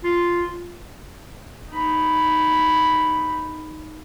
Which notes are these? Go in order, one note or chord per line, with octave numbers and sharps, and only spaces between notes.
F4
D#4 B5